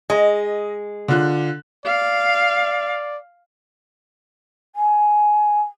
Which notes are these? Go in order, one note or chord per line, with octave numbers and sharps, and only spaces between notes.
G#3 D#5
D3 F4 F#6
D5 F5
G#5